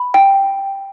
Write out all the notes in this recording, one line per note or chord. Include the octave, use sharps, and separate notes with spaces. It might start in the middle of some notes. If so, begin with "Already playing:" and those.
Already playing: B5
G5